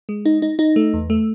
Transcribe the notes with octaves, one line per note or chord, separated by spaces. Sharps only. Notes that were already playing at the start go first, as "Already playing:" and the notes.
G#3
D#4
D#4
D#4
A3
E2
A3